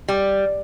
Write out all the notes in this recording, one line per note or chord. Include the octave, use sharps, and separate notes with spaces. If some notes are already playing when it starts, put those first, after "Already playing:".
G3